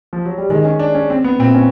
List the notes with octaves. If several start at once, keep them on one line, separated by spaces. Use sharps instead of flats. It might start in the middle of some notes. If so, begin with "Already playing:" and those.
F3
F#3
G3
D#3 G#3
C#4
D4
C#4
C4
B3
A#2 C4
C#4